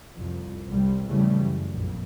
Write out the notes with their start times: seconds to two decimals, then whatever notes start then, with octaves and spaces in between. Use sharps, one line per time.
0.16 C2 F2
0.68 C2 C3 G3
1.07 E2 C#3 E3 G3 A3
1.39 F#2
1.73 A#1 F2